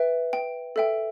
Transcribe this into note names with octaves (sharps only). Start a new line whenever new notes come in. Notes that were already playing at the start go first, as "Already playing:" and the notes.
Already playing: B4 E5 G5
G5
A4 E5 G5